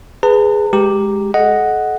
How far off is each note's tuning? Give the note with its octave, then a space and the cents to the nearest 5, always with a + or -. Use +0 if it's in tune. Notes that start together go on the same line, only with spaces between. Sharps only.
G#4 +0 B4 +0 A5 +45
G#3 +0 G4 +0 A#5 +0
A4 -40 D#5 +0 F#5 +0